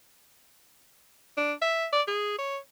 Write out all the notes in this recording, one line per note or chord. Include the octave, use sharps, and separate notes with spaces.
D4
E5
D5
G#4
C#5